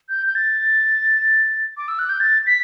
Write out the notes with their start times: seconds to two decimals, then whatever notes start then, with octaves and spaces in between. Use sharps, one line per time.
0.09 G6
0.26 G6
0.35 A6
1.77 D6
1.88 E6
1.99 F#6
2.09 G6
2.20 A6
2.47 B6